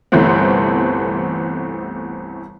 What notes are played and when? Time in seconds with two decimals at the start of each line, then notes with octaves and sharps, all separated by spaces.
0.12 G1 C2 E3 A3 B3 C4